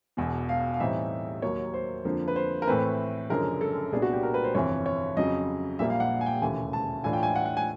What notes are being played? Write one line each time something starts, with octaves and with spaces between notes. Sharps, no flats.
E1 E2 B2
F5
F5
A2 E3 G3 C4 D#4 E5
D#2 D#3 F#3 A#3 C#5
C5
F2 D3 F3 A#3
B4
C5
A#4
A2 E3 A3 C4 B4
F#1 F#2 D3 F3 G#3 A#4
A4
C2 A#2 G3 B3 D4 G#4
F#4
G4
A#4
B4
C5
G1 F2 C3 E3 C#5
C#5
F2 C#3 F#3 D#5
A#1 A#2 G3 A#3 E5
F5
F#5
G#5
G5
E1 D#2 C#3 E3 A3 G#5
A5
A2 E3 A3 D4 F4 G#5
G5
G#5
F#5
F#5
G#5